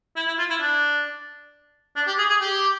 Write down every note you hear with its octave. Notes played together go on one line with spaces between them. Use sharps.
E4
E4
F4
E4
D4
D4
G4
G#4
G#4
G4